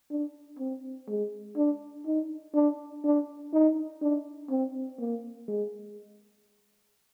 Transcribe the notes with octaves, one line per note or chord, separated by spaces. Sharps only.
D4
C4
G#3
D4
D#4
D4
D4
D#4
D4
C4
A#3
G#3